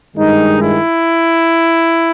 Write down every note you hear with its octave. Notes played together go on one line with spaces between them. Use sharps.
G2 D#3 G#3 D#4
E4